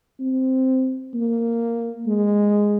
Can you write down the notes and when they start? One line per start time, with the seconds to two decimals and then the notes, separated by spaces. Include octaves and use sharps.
0.20 C4
1.14 A#3
2.07 G#3